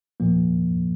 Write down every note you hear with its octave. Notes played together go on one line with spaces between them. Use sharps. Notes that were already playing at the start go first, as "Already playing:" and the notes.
A#2 F3 A#3